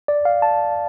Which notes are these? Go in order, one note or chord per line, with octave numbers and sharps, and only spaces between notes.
D5
F5
A5